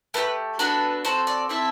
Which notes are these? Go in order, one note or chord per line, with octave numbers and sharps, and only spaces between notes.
A3 E4 G4 B4
B3 D4 F#4 A4 B4
C4 F#4 A4 C5
D5
C4 E4 A4 E5